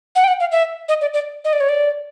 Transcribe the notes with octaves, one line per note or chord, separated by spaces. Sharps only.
F#5
G5
F#5
F5
E5
D#5
D5
D5
D#5
D5
C#5
D5